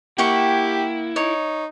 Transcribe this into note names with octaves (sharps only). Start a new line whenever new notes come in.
A#3 E4 G4 F#5 G5 C#6 C#7
D#4 C#5